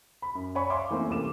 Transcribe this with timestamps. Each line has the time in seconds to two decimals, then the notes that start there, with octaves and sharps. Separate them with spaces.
0.22 B5
0.35 F#2
0.55 C#5 D5 F#5 G#5 B5 C#6
0.70 E5 F5 G#5 C6 D6
0.90 E3 A3 A#3 C4 C#4
1.09 C2 A#4 D6 E7